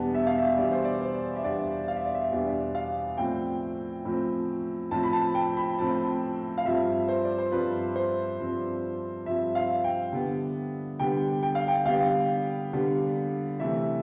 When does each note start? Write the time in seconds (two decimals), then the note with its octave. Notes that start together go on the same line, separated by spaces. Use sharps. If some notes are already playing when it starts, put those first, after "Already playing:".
Already playing: E2 B2 G3 B3 D4 A5
0.15 E5
0.27 F5
0.38 E5
0.57 E2 B2 G3 B3 D4 D5
0.72 C5
0.84 D5
1.01 C5
1.36 E5
1.44 E2 B2 G3 B3 D4 D5
1.88 F5
1.96 E5
2.05 D5
2.15 E5
2.31 E2 B2 G3 B3 D4 D5
2.75 F5
3.18 A2 F3 C4 G5
4.05 A2 F3 C4
4.91 A2 F3 C4 A5
5.03 B5
5.13 A5
5.35 G5
5.57 B5
5.78 A2 F3 C4 A5
6.58 F5
6.65 G2 F3 C4 F4 E5
7.08 C5
7.24 D5
7.38 C5
7.52 G2 F3 C4 F4 B4
7.96 C5
8.39 G2 F3 C4 F4
9.26 G2 F3 C4 F4 E5
9.55 F5
9.84 G5
10.13 D3 G3 B3
10.99 D3 G3 B3 G5
11.43 G5
11.55 F5
11.68 G5
11.86 D3 G3 B3 F5
12.73 D3 G3 B3
13.60 C3 E3 A3 C4 E5